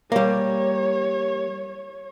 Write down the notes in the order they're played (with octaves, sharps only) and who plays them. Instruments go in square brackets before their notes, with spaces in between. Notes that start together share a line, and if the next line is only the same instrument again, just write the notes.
[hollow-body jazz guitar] G3 A#3 [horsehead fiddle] C#5